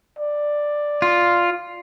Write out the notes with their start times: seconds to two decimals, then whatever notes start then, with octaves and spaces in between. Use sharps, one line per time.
0.19 D5
1.02 F4